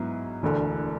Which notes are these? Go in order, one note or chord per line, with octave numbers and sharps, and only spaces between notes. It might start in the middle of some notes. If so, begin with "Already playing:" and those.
Already playing: G#2 F#3 B3 E4
E1 D2 D3